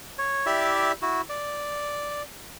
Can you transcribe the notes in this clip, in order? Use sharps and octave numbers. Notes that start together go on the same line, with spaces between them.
C#5
E4 G4 D5 E5
E4 F#4
D5